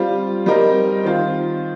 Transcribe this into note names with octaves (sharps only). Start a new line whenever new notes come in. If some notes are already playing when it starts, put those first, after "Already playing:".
Already playing: G3 C4 F4
G3 C4 D#4 A#4
D#3 C4 F4 C5